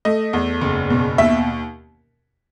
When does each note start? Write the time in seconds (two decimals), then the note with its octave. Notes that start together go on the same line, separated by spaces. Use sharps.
0.05 A3 D#5
0.33 E2
0.61 F#1
0.90 B2
1.18 D#2 E5